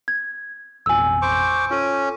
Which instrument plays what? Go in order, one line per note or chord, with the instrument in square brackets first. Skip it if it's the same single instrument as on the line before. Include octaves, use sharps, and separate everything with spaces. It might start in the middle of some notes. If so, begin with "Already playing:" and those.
[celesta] G#6
[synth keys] A1 F2 B2 [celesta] G#5 E6
[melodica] C5 C#6 D6
[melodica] C#4 [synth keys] F4 A4 D#7